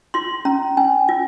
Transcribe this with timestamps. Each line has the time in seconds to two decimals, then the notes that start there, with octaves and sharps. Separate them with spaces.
0.14 F4 C6
0.45 C#4 A#5
0.77 C#4 G#5
1.09 F4